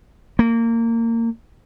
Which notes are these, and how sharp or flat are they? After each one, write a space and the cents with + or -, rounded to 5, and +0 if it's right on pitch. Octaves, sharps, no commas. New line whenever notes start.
A#3 -25